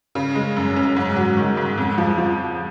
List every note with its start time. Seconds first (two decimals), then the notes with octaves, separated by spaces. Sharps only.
0.15 C#3
0.35 G#3
0.57 F#2
0.76 C#4
0.96 G#2
1.16 F#3
1.37 D#3
1.57 G#2
1.78 F2
1.98 F3
2.18 F3